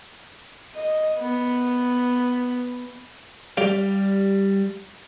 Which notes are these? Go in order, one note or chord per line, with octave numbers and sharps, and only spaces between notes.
D#5
B3
G3 G4 D5 F5